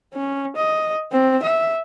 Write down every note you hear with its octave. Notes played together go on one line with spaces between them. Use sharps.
C#4
D#5
C4
E5